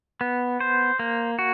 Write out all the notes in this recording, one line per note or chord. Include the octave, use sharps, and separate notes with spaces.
B3
C5
A#3
F#4